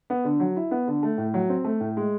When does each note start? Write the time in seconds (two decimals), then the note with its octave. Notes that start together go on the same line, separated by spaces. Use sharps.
0.10 B3
0.24 D3
0.40 F#3
0.57 E4
0.71 B3
0.88 D3
1.03 A3
1.18 A2
1.34 F#3
1.49 C4
1.64 A3
1.80 A2
1.97 G#3